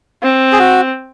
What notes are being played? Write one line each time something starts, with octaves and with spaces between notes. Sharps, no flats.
C4
G#4
F#4